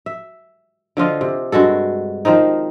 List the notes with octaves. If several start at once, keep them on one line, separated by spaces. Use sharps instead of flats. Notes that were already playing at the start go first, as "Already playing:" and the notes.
E5
D3 F3 F4 D#5
C3
G2 G#3 F#4 A4
D#3 F3 C4 D#4